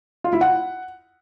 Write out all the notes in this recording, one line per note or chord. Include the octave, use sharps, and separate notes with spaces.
F4
E4
F#5